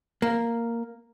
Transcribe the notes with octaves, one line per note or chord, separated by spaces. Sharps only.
A#3